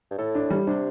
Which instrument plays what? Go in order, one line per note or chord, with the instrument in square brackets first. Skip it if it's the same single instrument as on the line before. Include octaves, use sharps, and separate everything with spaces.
[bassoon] G2
[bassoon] A2 [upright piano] A4
[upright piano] D4
G3
[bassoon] C3 [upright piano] D4